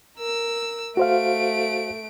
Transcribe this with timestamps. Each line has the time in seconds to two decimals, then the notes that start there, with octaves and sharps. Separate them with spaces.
0.18 A#4 E6
0.97 A3 F#4 C5 F5 D7